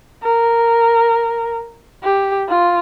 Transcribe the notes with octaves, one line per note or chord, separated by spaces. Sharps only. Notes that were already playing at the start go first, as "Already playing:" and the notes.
A#4
G4
F4